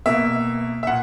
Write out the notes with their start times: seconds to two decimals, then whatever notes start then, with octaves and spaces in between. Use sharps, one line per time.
0.06 B2 A#3 E5
0.83 E5
0.87 A#2 F#5